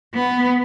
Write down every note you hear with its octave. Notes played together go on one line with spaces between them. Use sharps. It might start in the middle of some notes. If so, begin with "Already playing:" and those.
B3